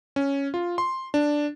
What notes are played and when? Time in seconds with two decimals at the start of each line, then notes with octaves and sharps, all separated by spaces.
0.16 C#4
0.54 F4
0.78 C6
1.14 D4